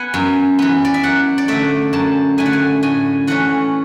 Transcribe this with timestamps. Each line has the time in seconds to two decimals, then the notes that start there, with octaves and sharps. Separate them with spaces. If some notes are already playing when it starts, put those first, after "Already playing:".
Already playing: B3 F#5 G#5
0.14 F#2
0.59 E3 B3
0.85 D5
0.94 E5
1.03 F#2 F#5
1.38 D5
1.48 D3 A3 E5
1.93 F#2 A5
2.38 D3 A3 G#5
2.46 F#5
2.53 G#5
2.83 A2 G#5
3.27 E3 A3 C#4 F#5